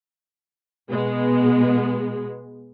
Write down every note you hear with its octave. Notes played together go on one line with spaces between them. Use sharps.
B2 G#3 B3